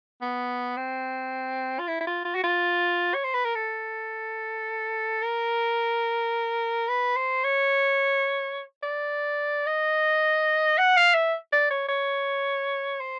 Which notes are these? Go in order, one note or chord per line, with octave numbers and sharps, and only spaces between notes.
B3
C4
F4
E4
E4
F4
F4
F#4
F4
C#5
C5
B4
A#4
A4
A#4
B4
C5
C#5
D5
D#5
F#5
F5
E5
D5
C#5
C#5
C5